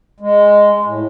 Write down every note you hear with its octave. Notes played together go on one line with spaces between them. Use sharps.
G#3
A2